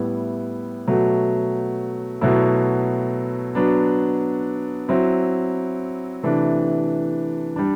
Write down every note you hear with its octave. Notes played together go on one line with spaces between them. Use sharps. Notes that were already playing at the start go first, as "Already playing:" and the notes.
Already playing: A2 G3 B3 E4
B2 F#3 A3
B2 F#3 A3 E4
F#3 B3 D4
F#3 C4 E4
C3 E3 A3 D4
G3 D4